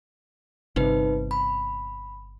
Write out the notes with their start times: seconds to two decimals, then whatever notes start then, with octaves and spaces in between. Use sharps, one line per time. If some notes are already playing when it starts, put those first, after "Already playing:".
0.76 G1 C3 D#4 B4
1.31 B5